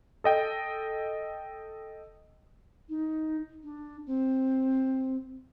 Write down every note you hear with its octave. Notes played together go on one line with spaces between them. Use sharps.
A4 D#5 G5
D#4
D4
C4